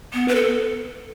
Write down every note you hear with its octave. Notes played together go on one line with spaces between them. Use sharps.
B3
B4
A4